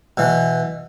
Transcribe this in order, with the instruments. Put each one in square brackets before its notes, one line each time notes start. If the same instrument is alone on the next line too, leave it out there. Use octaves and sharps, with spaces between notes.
[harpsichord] B2 E3